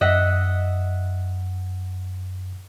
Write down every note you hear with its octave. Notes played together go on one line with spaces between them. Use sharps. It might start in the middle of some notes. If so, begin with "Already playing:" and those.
F#2 D#5 E5 F#5